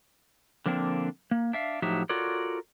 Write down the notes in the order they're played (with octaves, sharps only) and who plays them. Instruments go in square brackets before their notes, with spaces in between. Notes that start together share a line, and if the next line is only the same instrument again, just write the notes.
[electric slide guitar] D3 F3 A#3 C4 D4
A#3
D4 E5 F5
A2 F3 F#3 D#4 G4 E5
F4 F#4 A4 A#4 C#5 D5